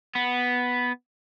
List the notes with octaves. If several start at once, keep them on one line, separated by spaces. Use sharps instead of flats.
B3